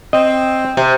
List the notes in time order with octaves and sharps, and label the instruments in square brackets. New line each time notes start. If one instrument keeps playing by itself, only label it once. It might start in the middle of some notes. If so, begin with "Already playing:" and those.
[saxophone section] C4 [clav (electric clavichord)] D#5
[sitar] C3